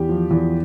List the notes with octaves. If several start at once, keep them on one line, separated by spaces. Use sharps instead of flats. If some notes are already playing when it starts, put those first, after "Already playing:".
Already playing: E2 G4
F3
E2